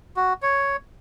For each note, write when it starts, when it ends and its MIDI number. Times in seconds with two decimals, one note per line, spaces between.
0.17 0.33 66
0.42 0.76 73